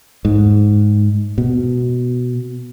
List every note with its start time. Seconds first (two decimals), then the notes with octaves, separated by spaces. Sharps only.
0.25 G#2
1.38 B2